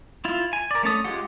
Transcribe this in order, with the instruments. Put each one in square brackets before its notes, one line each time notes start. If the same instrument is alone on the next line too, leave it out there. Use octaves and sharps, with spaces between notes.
[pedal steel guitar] E4 F4
G#5
A#4 D5
A3 C#4 A5 D#6
G#3 F4 G4 F#5